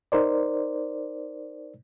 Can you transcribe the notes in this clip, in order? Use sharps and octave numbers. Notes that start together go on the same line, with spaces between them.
D#4 A#4 C5 D5